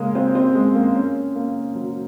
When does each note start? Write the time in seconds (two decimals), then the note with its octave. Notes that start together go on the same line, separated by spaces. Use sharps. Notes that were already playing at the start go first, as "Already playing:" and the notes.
Already playing: C#3 G#3 A#3
0.15 C4
0.35 C4
0.55 G#3
0.75 A#3
0.95 C#4
1.35 A#3
1.75 F#3